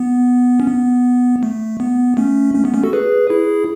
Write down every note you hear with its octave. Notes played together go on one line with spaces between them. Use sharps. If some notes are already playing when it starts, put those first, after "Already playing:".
Already playing: B3
C#4
B3
A3
B3
A3 C#4
A3 C#4
B3
A3 C#4
F#4 A4
G#4 B4
E4 G#4